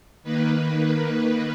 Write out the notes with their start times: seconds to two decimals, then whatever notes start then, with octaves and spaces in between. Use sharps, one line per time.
0.23 D#3 A#3 B4